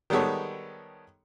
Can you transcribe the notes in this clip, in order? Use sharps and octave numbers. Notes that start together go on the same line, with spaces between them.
D#3 G3 G#3 B3 A4 C#5